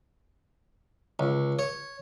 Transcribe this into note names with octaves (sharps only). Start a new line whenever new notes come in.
C#2
C#5